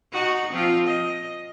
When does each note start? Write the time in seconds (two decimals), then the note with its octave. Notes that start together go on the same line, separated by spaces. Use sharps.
0.12 D#4 F#4
0.51 F3 C4 F4
0.87 D#5